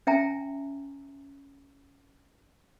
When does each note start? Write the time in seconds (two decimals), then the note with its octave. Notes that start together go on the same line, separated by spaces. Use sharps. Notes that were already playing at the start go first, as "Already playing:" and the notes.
0.07 C#4 E5 G5 G#5 A#5